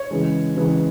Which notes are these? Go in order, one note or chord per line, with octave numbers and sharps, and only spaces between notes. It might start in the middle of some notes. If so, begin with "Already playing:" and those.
Already playing: C#5
C#3 E3 G#3
C#3 E3 G#3